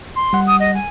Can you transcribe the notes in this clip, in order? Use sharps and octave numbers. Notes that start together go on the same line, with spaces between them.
C6
G3 F#5
D#6
D#5
G#5